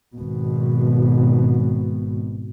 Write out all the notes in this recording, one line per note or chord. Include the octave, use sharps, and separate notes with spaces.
G#1 B2